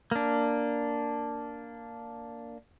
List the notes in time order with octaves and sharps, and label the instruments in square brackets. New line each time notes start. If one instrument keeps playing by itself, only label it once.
[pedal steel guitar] A#3 D4